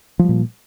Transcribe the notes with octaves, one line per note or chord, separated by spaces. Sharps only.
A#2 F3 G3